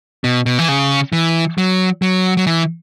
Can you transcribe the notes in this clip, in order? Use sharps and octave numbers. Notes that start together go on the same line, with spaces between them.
B2
B2
E3
C#3
E3
F#3
F#3
F#3
E3